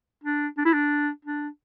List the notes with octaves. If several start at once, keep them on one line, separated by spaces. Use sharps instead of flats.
D4
D4
E4
D4
D4